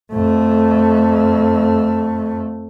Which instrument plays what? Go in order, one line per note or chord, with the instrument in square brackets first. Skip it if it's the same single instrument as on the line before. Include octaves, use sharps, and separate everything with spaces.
[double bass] F2 A3